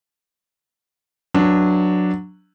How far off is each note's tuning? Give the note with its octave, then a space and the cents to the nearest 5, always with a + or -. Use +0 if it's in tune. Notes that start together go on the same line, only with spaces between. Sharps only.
F#3 -10 D4 +0 B4 +0